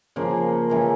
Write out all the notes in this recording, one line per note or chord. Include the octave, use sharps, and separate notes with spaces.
C#3 F3 A#3
C#3 E3 A#3